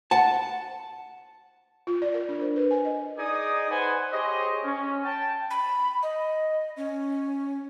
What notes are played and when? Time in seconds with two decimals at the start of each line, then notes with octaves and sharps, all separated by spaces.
0.11 F#5 A5
1.87 F4
2.02 D5
2.14 A#4
2.29 D4
2.41 C5
2.56 B4
2.71 G#5
2.85 D#5
3.17 D#4 G#4 D5 D#5 G#5 D#6
3.71 B4 C5 F#5 G#5
4.12 G4 G#4 C5 C#5 D#5
4.64 C#4
5.04 G5 A5
5.51 B5
6.03 D#5
6.77 C#4